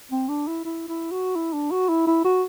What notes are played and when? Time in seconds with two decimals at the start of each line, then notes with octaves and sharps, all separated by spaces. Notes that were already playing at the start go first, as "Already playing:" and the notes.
0.12 C4
0.29 D4
0.48 E4
0.65 E4
0.89 E4
1.12 F#4
1.36 E4
1.53 D4
1.71 F#4
1.89 E4
2.07 E4
2.25 F#4